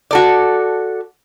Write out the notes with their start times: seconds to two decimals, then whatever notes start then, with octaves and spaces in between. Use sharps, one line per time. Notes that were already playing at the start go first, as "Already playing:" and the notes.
0.11 F#4 A4 D5